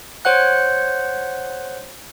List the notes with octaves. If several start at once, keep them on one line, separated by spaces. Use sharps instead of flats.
C5 C#5 F#5 F#6